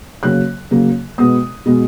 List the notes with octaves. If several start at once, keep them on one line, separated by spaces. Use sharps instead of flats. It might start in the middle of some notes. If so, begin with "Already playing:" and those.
C#3 F#3 A#3 F#6
C#3 F#3 A#3
B2 G#3 B3 D#6
B2 G#3 B3